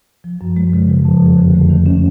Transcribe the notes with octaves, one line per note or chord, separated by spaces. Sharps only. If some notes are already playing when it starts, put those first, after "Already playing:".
F3
F#2
G#3
C#3
F3
F2
F2
D3
A3
D#3
C#4